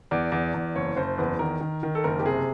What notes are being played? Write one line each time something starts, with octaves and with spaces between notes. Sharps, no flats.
E2 D5
E2
E2
F#1 C#5
F#1 C5
E2 B4
D#3 A#4
D#3
D#3
A4
F#1 A#4
G4
C3 G#4